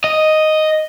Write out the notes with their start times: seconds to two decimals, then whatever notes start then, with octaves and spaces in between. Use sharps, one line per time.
0.04 D#5